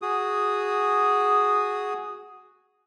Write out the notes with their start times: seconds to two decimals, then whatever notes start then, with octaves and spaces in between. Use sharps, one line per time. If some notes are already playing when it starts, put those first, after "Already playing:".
0.02 F#4 G#4 D#6